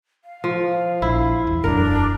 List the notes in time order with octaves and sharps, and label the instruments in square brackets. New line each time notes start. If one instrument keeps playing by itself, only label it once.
[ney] F5
[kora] F3
[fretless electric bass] A#1 [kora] E4
[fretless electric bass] E2
[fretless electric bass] E1 F#2 [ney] D4 [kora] A#4